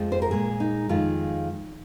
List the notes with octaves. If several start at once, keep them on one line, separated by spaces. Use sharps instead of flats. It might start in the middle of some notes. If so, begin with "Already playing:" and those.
Already playing: F2 F3 G#3
C5
A#4
A#2 G#3 G#4
D#4
F2 D#3 G#3 F4